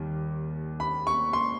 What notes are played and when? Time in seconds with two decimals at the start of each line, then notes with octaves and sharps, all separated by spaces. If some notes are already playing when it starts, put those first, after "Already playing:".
Already playing: D#2 D#3 G3
0.80 B5
1.07 C#6
1.33 C6